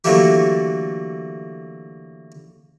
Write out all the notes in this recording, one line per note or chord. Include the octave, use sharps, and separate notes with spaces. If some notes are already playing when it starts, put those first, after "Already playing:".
D3 E3 F#3 A3 A#3 G4